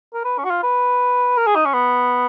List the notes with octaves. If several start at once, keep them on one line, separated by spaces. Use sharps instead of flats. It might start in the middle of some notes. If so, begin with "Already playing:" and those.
A#4
B4
C#4
F#4
F4
B4
A#4
G#4
D#4
C#4
B3